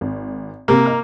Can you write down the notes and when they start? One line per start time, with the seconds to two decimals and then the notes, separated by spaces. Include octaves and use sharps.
0.01 G#1
0.68 C3 A#3
0.86 D#5 A#5 F6